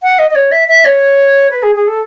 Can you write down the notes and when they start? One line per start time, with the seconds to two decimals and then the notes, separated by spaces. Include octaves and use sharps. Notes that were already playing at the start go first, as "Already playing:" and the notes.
0.03 F#5
0.19 D#5
0.31 D#5
0.35 C#5
0.52 E5
0.68 E5
0.85 C#5
1.50 B4
1.63 G#4
1.75 G#4
1.87 A4